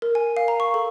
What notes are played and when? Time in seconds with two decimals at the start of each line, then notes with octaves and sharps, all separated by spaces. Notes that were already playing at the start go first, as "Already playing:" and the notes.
0.02 A#4
0.15 G#5
0.37 F5
0.48 A#5
0.60 C#6
0.74 A4